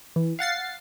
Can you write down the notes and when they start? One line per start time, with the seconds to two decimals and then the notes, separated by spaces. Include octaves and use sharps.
0.16 E3
0.39 F5 F#5 A6 C7